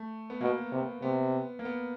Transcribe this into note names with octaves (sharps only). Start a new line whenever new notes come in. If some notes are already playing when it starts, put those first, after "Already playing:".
Already playing: A3
B3
B2 A#3
C3 B3
C3 B3
A#3
B3